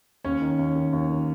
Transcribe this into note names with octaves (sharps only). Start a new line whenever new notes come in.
D#2 C#4 C#5
D#3
D#2
D#3
D#2
D#3